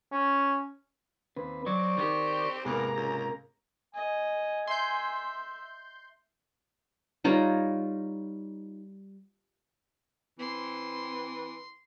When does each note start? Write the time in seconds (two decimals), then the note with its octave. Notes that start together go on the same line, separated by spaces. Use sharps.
0.12 C#4
1.37 D#2 C4 B4
1.66 F#3 C4 D5 C#6
1.98 D#3 G4
2.65 E2 G#2 C3 A#3 G#4 A#5
2.96 C#2
3.95 D#5 G#5
4.68 E5 C6 G6
7.24 G3 D#4 F4 C#5
10.39 E3 C4 C6